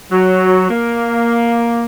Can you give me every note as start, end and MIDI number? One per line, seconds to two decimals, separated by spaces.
0.12 0.68 54
0.70 1.86 58